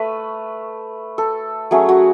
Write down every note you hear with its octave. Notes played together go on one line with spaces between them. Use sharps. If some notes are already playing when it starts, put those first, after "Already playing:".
Already playing: A3 B4
A4
F#3 A3 C#4 G#4
F#4